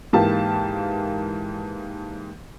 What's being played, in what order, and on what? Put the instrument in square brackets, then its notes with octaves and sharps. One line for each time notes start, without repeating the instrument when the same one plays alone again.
[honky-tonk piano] G#2 E3 A#3 G4 F5 A5